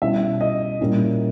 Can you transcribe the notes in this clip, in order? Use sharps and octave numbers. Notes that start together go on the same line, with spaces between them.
B2 G3 C#4 E4 E5
D#5
A#2 G3 A#3 C#4 E4